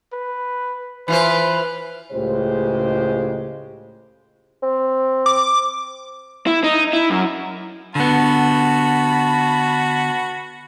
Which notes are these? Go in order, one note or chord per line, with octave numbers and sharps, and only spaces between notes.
B4
E3 F4 B4 C5
C#2 A2 C#3 G#3 G4 C5
C4
D6
E4
D#4
E4
F#2
D3 B3 F#4 A5 B5